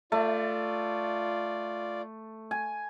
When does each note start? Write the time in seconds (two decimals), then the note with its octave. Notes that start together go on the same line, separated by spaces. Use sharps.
0.12 A3 F4 D5
2.51 G#5